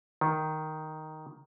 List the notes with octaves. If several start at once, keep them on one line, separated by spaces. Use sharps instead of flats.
D#3